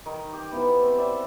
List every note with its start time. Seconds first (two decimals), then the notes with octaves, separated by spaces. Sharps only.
0.06 D#3 D#4
0.33 G4
0.51 B3 E4 F#4 C5
0.83 C4
0.98 C5 D5 E5